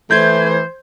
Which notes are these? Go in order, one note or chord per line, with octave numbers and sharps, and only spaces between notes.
E3 A3 C5 G6 G#6